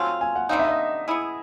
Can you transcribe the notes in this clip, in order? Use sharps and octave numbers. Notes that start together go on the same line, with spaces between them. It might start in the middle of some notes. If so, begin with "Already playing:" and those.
Already playing: F#3 A3 C4 F4 G#5
G#5
F#5
D3 G3 C4 D#4 F5
E5
D#5
B3 E4 G#4